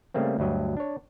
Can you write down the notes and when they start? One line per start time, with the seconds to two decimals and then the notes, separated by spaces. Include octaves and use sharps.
0.14 C#3 G3 A3 A#3 C4
0.39 D2 G2 F#3 D#5
0.77 D4 C#5